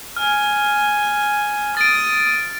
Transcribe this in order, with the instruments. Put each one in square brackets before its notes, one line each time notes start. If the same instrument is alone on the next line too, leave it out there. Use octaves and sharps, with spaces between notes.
[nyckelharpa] G#5 [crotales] F6
[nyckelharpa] D#6 [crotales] A6 D7